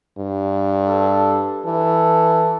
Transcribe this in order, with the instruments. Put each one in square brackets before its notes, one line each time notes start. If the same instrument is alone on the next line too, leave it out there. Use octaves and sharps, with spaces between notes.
[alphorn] G2
[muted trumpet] A4
[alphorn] E3 [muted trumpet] A4